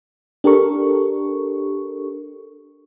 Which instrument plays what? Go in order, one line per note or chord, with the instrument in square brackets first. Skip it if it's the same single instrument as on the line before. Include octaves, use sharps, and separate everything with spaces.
[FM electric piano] D4 G4 A4 A#4 C#6